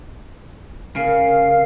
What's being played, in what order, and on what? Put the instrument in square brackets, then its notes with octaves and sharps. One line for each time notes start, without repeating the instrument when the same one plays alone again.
[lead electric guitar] C#3 [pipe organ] A#4 F5